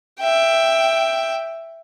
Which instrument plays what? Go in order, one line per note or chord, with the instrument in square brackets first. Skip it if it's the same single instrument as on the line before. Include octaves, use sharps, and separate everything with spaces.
[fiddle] E5 G5